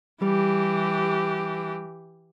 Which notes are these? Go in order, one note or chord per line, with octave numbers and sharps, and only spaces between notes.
E3 G3 G4